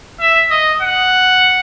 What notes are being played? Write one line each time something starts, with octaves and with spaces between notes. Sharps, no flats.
E5
D#5
F#5